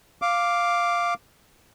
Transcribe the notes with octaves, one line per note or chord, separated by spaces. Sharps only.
F5 D6